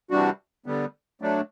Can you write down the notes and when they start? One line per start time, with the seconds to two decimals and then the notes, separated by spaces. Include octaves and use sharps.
0.10 C3 E3 G3 D4 F#4
0.66 D3 G3 B3
1.22 F#3 A3 D4